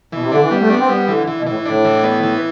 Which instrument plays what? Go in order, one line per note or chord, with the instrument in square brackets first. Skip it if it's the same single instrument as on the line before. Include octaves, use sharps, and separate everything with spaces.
[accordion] B2 [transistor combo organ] E3
[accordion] C3
[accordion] D3 [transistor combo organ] D4
[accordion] E3
[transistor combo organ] G3 [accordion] B3
[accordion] A3
[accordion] B3 [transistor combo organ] D4
[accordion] C4
[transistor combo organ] G3 [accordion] B3
[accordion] D3 [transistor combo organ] E3
[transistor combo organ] E3
[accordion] B2
[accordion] A2 [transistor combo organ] E3
[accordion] A2 [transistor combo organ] D4
[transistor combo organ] E3
B3
E3